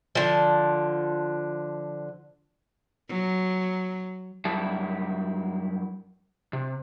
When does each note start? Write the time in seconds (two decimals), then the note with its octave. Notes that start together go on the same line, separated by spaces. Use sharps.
0.15 D3 F3
3.08 F#3
4.45 F#2 G3 E4 A5
6.53 C3